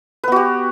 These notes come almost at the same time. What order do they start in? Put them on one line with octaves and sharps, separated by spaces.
B4 B3 F#4 G4